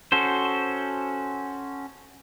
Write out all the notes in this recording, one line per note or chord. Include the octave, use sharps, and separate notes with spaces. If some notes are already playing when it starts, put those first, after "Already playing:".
C#4 F#4 A4 C5